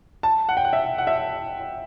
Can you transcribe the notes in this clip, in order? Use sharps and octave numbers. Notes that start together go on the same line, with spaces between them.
A5
F#5
G5
F#5
E5
F#5
E5